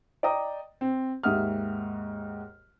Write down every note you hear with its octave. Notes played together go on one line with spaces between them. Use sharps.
D5 D#5 G5 A#5 D#6
C4
D#2 G#2 E5 F#5 D#6 F6